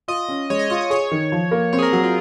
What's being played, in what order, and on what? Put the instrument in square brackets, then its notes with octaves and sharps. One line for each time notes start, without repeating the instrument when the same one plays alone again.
[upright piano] F4 [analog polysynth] D#5
[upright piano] C#4
[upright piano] G#3 [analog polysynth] C#5
[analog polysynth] D#5
[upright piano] F4 [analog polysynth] D#5
[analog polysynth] D#5
[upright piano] G#4 [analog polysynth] C#5
[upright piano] D#3
F3
A#3
[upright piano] C4 [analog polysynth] C#5
[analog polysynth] G#4
A#4
[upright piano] F#3 [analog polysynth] A#4
[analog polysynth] F4